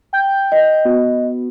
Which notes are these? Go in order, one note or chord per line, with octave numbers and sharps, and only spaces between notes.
G5 G6
D#5
B3 F#4